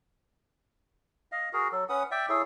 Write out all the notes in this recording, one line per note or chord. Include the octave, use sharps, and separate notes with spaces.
D#5 F5
F#4 G#4 A#4
F#3 A4
C#4 B4 F#5 D#6
D5 E5 G5
E4 G#4 A4 C#5